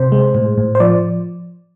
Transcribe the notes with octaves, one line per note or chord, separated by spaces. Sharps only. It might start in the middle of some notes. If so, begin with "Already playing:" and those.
Already playing: C3 C5
G#3
A2
A2
C5
F3 D5